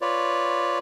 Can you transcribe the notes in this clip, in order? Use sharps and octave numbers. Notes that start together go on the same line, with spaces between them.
F4 B4 C#5 D5